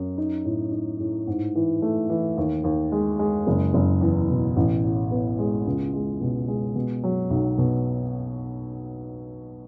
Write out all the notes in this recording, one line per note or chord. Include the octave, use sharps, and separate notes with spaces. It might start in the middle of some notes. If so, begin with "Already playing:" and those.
Already playing: F#2
D#4
A2
D#4
A2
G#2
E3
A3
E3
D#2
D#2
G#3
G#3
F#1
F#1
E2
B2
A1
A2
B3
G#3
C#2
G#3
B2
G#3
B2
F#3
B1
B2